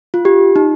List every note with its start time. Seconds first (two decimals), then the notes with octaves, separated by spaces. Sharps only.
0.14 F4
0.25 G4
0.56 D#4